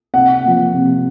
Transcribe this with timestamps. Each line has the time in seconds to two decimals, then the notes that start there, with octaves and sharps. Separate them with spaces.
0.14 C3 F#5
0.44 F3 A#3
0.73 C3